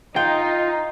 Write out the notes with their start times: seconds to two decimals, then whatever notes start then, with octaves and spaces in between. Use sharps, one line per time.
0.16 D#4 F4 G5